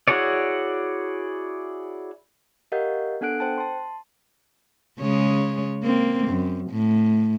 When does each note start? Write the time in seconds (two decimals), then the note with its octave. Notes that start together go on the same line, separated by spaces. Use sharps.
0.08 E4 F#4 G#4 C#5 D5
2.72 G4 A#4 D#5 F5 F#5 G6
3.21 B3 D4 A4 F#5 F#6 D7
3.40 C5 G5 A5
3.58 A5 C6
4.99 C#3 G#3 C#5
5.83 A#3 C4
6.28 F#2
6.71 A2